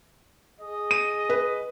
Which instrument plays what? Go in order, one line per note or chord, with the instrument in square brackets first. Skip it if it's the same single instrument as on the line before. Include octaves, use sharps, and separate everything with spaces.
[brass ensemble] G#4 D#5
[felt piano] D#7
B4